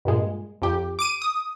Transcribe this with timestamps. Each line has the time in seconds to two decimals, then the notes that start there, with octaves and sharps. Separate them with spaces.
0.05 G2 A#2 G#3
0.62 F2 G4
0.99 D6 D7 D#7
1.22 D#6